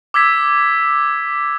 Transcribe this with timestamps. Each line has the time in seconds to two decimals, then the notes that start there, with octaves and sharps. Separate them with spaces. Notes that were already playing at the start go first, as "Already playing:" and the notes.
0.14 D6 E6 G#6 B6